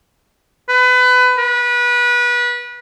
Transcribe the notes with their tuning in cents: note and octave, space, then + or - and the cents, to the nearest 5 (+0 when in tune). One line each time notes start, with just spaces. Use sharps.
B4 +25
B4 -25